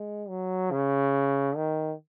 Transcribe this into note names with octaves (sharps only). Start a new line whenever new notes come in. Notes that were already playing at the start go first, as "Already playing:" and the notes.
Already playing: G#3
F#3
C#3
D#3